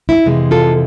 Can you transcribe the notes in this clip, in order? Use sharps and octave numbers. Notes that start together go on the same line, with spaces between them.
E4
F2 C3 E3 G#3
F4 A4